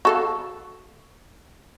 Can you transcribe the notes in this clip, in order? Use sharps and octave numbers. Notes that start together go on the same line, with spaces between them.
F#4 A4 F5